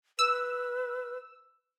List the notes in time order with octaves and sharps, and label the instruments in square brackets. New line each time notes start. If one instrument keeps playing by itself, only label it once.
[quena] B4 [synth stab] E6